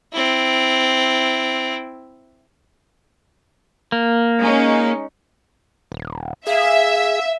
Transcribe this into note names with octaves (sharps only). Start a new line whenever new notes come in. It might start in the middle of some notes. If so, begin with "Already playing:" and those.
C4 E4
A#3
G#3 C#4 D#4
D#1
G#4 E5 F5